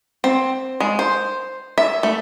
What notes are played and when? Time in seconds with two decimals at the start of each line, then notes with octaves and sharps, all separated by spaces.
0.24 C4
0.80 G#3
0.99 C5
1.78 E5
2.03 A3